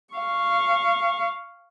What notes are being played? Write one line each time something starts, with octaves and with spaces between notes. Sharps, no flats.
F5 C#6